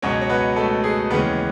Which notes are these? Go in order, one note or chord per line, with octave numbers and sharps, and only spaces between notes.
C#2 B2 F#3 C#4 C#5
C#5
B3 B4
A3 A4
G#4
D#2 C#3 E3 G#3 B3 C#4 B4